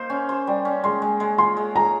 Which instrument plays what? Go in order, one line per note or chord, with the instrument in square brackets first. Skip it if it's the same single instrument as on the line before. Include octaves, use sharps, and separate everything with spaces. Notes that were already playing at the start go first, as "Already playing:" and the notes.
Already playing: [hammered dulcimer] A#3 D#4 C5
C#4
C5
G3
C#4
[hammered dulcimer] G#3 [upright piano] C6
[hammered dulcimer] G#3
G#3
[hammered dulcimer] F4 [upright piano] C6
[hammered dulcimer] G#3
[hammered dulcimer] G#3 [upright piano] A#5